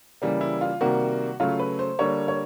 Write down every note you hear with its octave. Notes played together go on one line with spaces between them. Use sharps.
C#3 E3 G3 A#3
E4
F4
C3 D#3 G3 A#3 F#4
C#3 F#3 A3 F4
B4
C5
D3 G3 A#3 C#5
C#5